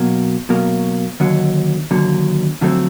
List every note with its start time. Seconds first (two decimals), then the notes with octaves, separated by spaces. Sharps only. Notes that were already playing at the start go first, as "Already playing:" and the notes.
Already playing: B2 F#3 A#3
0.49 B2 F#3 A#3
1.20 D#2 D3 F#3
1.91 D#2 D3 F#3
2.61 F2 D3 F#3 A3 C4